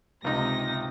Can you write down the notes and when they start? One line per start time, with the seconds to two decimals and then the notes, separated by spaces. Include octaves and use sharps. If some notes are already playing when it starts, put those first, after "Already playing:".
0.24 C#2 C3 D#4 A#6